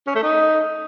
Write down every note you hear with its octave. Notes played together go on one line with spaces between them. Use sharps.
C#4
A3
D#4